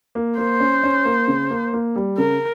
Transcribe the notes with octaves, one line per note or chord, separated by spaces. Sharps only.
A#3
A#3 C5
C#4
C#4
A#3
C#3
A#3
A#3
G3
C#3 A#4